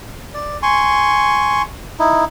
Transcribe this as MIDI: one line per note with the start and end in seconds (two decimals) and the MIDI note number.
0.34 0.58 74
0.63 1.62 80
0.63 1.62 84
0.63 1.62 85
1.99 2.25 63
1.99 2.25 64